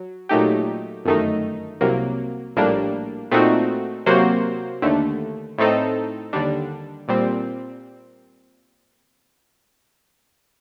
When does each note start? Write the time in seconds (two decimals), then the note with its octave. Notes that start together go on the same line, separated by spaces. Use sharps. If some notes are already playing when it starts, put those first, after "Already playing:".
Already playing: F#3
0.29 A#2 F#3 A3 D#4 G4
1.05 G1 F#2 D#3 A3 D#4
1.81 C2 C3 F#3 A#3
2.56 A#1 A2 G3 A#3 D4
3.31 A#2 A3 C4 D#4 F#4
4.06 C3 F#3 A#3 F#4 C5
4.82 D#2 D3 A3
5.58 A2 A3 C4 D#4 A4
6.33 D#2 D3 G3 D4
7.08 A#2 G3 C4